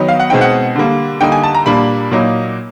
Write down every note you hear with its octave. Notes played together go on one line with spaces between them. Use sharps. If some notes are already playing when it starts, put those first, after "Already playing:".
Already playing: D#3 F#3 B3 D#4
F5
F#5
B2 G#3 C4 D#4 G5
F#5
D3 G3 A#3
D3 G3 A#3 D#4 G5
G#5
A5
A#5
A#2 G3 A#3 D4 B5
A#2 F#3 A#3 D#4